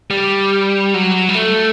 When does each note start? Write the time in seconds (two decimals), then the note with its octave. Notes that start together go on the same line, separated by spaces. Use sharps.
0.10 G3
0.94 F#3
1.29 G3
1.35 A3